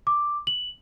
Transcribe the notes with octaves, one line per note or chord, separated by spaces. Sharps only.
D6
F#7